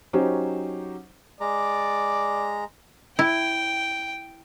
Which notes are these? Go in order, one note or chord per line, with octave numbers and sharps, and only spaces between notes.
F#3 C#4 D#4 G4 C5
G#3 D5 A#5
E4 G5